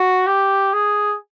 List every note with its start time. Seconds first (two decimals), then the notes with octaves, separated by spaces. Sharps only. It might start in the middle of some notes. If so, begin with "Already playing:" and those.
Already playing: F#4
0.27 G4
0.73 G#4